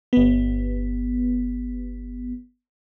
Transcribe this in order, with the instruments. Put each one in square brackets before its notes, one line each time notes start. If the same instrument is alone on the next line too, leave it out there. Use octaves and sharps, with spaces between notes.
[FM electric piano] G1 B3